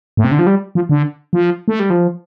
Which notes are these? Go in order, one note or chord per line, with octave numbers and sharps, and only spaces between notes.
A2
C3
D3
F3
G3
F3
D3
F3
A3
G3
F3